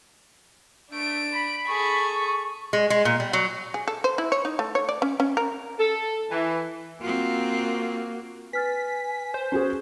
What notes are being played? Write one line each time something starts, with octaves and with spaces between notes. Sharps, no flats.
A3 D4 D7
B5
G#4 A4 C#6
G#3
G#3
A#2
G3
F#3
G#4
A4
C5
E4
C#5
D#4
A3
C#5
D5
C#4
C#4
A#4
A4
E3
A#3 C4 F4 F#4
B4 G#5 F6 A6 B6
C5
C#4 F#4 G#4